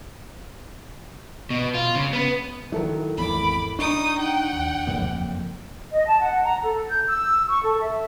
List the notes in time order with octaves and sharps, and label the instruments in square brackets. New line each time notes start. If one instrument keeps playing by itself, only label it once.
[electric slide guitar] B2
F4
C#3
B3
[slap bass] D#3 F#3 [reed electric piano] E4 A4 A#4
[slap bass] G#1 E2 [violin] B5 D6
[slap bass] D4 [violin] D#4 D#6 [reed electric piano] C#6
[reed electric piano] D#4 [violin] F#5 G5
[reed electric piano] D#2
[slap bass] F#1 F2 A#3
[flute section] D#5
A5
F#5
A#5
A4
G6
E6
C#6
A4
E5